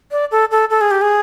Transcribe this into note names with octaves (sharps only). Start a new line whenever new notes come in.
D5
A4
A4
A4
G#4
G4
G#4